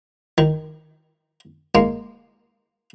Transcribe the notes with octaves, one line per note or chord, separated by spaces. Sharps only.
D#3
G#3 A#3